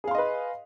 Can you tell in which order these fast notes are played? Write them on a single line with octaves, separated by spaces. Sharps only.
G#4 F5 C6 D#5 B4